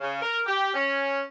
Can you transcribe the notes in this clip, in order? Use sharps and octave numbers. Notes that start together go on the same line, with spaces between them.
C#3
A#4
G4
C#4